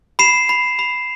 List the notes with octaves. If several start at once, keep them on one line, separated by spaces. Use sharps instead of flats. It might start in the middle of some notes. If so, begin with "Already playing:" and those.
B5 C7 E7
B5
B5